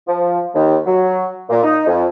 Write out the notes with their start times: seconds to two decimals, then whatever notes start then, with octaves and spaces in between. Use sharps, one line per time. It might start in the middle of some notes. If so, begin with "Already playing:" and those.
0.08 F3
0.55 D#2
0.86 F#3
1.50 A#2
1.63 D#4
1.87 F2